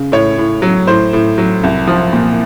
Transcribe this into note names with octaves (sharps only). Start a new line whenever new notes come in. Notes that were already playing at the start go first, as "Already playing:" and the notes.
Already playing: C#3
A2 C#5
A2
F#3
A2 C5
A2
F#3
C2
F3
A#2